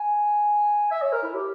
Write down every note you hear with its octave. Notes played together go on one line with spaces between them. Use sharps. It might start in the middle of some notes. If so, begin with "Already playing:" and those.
Already playing: G#5
E5
C#5
A#4
E4
G4